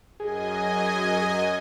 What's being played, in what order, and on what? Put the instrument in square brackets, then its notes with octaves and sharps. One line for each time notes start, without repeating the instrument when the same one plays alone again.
[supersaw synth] F#2 D#5 G#5 [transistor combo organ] G#4